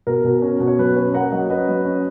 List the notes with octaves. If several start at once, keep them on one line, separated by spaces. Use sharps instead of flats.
B2 A#4
B2
C#4
B2
C#5
F#3 B4
C#4 B4
A#3 F#5 A#5
F#3 D#5 F#5
C#4 B4 D#5
F#3
C#4